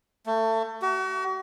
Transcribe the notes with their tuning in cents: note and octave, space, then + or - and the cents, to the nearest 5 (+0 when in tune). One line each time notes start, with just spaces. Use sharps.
A3 +25
F#4 +40